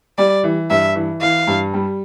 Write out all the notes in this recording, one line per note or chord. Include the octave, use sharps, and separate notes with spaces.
G3 D5
E3
G2 E5
E3
E3 F5
G2
G3